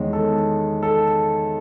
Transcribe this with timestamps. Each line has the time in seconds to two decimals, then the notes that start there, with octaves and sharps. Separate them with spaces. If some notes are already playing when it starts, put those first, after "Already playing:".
Already playing: E2 D#3 G#3 C#5
0.13 A4
0.83 A4